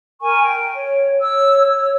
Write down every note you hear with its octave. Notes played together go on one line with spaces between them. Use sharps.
A#4 G#5 C#6
G5
C#5
C#5 E6
C#5